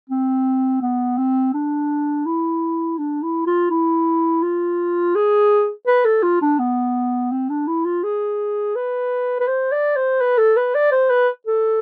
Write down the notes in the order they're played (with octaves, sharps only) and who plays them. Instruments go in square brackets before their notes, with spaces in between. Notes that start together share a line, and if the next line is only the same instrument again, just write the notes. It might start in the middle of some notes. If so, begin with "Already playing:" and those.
[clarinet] C4
B3
C4
D4
E4
D4
E4
F4
E4
F4
G#4
B4
A4
F4
D4
B3
C4
D4
E4
F4
G#4
B4
B4
C5
D5
C5
B4
A4
B4
D5
C5
B4
A4